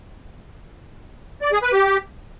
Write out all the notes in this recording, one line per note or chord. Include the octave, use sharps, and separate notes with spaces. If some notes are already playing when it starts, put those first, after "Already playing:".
D5
G#4
B4
G4